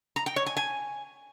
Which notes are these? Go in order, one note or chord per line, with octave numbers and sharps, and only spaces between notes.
A#5
G5
C#5
G#5
G#5